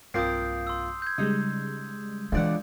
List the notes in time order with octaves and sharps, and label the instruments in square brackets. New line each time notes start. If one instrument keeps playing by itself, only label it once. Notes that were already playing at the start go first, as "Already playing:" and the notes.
[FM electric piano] B1 G2 [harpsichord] F3 A#3 C4 [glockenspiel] D#6 G6 C7
[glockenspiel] C6 E6
G6 G#6
[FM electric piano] C#3 G3 G#3 [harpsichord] D#4
[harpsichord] C#2 D5 F#5 [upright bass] E3 D4